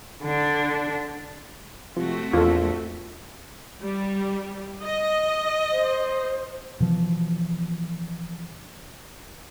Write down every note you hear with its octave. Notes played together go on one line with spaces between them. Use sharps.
D3 D4
C3 F3 A3 C4 F#4
A#1 E2 F4 A4
G3
D#5
C5
B2 E3 F3